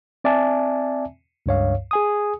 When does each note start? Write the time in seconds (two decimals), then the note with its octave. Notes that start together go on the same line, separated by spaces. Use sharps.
0.24 C4 D5 E5 G#5 A5
1.46 C#2 G2 C#5 F5
1.91 G#4 G#5 D#6